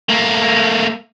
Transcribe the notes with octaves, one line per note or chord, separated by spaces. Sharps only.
A3 A#3